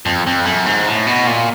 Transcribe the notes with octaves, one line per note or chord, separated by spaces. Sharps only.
F2
F2
F#2
G#2
A2
B2
A#2